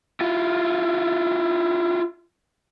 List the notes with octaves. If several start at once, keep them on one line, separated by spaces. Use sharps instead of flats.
E4 F4